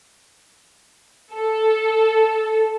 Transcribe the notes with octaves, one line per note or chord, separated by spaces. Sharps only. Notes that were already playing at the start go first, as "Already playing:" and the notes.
A4